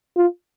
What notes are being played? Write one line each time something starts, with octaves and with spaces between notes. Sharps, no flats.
F4